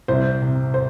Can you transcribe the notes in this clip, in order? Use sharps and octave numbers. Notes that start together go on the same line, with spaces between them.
C2 C5
C3
C5